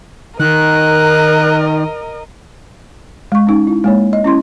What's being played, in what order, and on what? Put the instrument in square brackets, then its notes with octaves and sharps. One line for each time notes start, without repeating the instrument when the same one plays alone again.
[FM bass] D#3 [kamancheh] A#4 D#5 [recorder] F#6
[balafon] G#3 C#6
C#4 D#4
E4
G#3 A#3 C#5
D#5
C#4 E4 C6